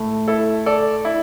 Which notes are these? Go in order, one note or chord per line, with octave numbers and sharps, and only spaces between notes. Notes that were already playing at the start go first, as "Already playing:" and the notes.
Already playing: A2 A3
E4 A4
A4 D5
E4